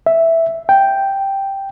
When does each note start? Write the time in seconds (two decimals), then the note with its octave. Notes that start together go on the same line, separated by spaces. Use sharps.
0.06 E5
0.69 G5